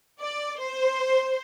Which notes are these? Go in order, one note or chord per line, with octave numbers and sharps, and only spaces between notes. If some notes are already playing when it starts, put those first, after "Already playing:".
D5
C5